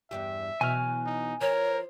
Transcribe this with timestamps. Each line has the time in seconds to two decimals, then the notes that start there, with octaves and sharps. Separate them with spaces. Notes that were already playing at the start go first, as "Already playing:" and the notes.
0.11 E2 G2 G4 E5
0.61 B2 E3 F#3 G#5 F6
1.06 D#4
1.41 F3 A#4 C#5